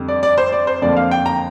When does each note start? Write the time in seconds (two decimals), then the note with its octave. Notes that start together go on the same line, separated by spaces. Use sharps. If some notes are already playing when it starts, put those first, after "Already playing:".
Already playing: F2 D3 G3
0.08 D5
0.23 D5
0.38 C5
0.52 D5
0.67 C5
0.82 F2 D3 F3 A#3 D5
0.97 F5
1.11 G5
1.26 A#5